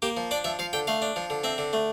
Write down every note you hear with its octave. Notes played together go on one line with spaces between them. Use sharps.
A#3 G4
F3
D4 D5
F3 E5
F3 F5
D3 G5
A3 F5
D4
F3
D3
C4 E5
D3
A3